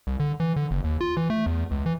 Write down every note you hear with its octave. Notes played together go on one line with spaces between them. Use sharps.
C2
D3
E3
D3
F#1
D#2
F4
E3
A3
E2
C#2
E3